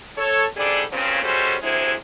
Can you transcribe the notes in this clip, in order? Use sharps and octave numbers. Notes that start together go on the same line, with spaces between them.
A4 C#5
G#2 G3 D4 G#4 A4 D5
G2 A#2 C#3 C4 C#4 C5
G3 G#3 C#4 F#4 A4 C5
D2 C3 G#3 E4 C5